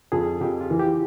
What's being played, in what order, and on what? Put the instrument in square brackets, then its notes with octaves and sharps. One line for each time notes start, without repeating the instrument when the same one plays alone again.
[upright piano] F2 [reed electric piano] G#4
[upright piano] F2 [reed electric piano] G4
[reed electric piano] F4
[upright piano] E3
[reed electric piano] G4